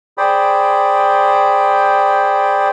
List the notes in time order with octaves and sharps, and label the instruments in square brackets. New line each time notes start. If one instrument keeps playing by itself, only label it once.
[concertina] G#4 C5 D5 G5 B5